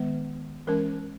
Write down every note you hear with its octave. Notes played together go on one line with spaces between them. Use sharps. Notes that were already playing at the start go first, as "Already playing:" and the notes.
Already playing: D#3 G#3 B3
E3 G#3 C#4 A#4